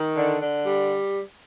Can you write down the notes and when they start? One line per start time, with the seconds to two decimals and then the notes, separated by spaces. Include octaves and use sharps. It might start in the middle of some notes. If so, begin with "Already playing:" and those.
Already playing: D#3
0.16 D3
0.41 D3
0.64 G3